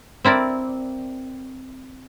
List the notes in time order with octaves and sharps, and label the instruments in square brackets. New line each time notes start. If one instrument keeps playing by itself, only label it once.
[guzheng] C4 E4 A#4 D5